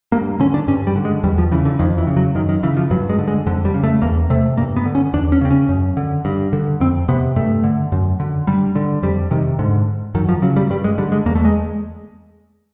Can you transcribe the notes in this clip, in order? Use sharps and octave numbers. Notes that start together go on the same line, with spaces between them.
G2 A#3
D3 C#4
D4
G2 C#4
G3
D3
G#3
E2 G3
F3
C#3 E3
D3
F2 D#3
E3
C#3
F#3
F#2 D#3
D#3
C#3 E3
F3
G2 F#3
G#3
D3
G#3
F2 D3
G3
C#3
A3
E2 A#3
C3 A3
G2 A#3
B3
D3
C#4
E2 D4
C#4
C#3 C4
C#4
F#2
D3
G2
D3
F2 C4
C3 B3
G2 A3
D3
F#2
D3
G2 G3
D3
F2 G3
C3 D#3
G#2 D3
F#2 D#3
F3
C#3 F#3
G3
G2 G3
G#3
D3 G3
G#3
E2 A#3
A3
G#3